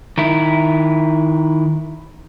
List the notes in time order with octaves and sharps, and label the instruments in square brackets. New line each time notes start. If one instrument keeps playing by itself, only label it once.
[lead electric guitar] D#3 E4